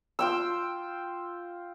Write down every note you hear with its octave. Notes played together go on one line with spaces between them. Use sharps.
F4 G5 E6